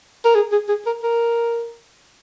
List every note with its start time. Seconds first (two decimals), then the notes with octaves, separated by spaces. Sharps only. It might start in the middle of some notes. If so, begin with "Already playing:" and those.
0.25 A#4
0.35 G#4
0.52 G#4
0.69 G#4
0.86 A#4
1.03 A#4